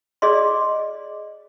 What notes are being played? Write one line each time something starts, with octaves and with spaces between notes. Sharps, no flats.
G#4 D5 D#5 C6